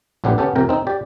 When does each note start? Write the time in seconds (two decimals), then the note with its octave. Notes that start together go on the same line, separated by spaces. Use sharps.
0.24 A#1 A2 D3 B3 G4 B4
0.38 B3 C#4 G4 A4
0.55 F2 C3 A#4 G5
0.69 C4 D#4
0.87 G4 D5